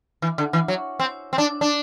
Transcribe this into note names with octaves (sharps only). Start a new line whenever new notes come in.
E3
D3
E3
F#3
C4
C4
D4
D4